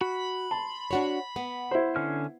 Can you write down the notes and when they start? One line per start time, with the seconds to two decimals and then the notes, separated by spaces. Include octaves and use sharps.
0.01 F#4 B5
0.51 A5 C6
0.91 D4 F#4 C#5
1.36 B3
1.71 E4 C5
1.96 D3 C#4 F6